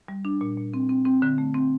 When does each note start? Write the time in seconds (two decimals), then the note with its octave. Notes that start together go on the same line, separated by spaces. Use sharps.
0.08 G3
0.25 D4
0.41 A#2
0.57 A#2
0.74 C4
0.89 C4
1.05 C4
1.22 D3
1.38 A3
1.54 C4